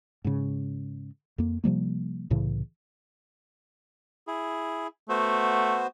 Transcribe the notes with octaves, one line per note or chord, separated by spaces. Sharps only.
G#2 C#3
F2 A#3
C3 F3 G3 A#3
C2 A2 C#3 E3
E4 G#4
A3 B3 F#4 C5